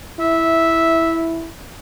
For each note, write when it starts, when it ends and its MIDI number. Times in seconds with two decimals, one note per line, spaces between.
0.20 1.50 64
0.20 1.27 76